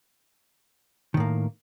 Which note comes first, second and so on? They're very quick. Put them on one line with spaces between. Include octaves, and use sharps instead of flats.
D#3 A2 A#3